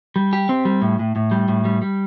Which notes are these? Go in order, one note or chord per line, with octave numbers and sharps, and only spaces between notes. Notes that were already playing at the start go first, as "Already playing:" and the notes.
G3
G4
C4
G3
A2
A2
A2
G3
A2
G3
G3